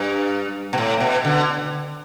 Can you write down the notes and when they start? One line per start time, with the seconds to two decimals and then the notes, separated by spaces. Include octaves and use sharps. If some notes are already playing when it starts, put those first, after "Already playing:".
Already playing: G2
0.73 B2
0.78 A2
1.00 B2
1.25 D3